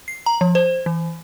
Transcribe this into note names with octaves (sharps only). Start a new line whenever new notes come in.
C7
A#5
F3
C5
E3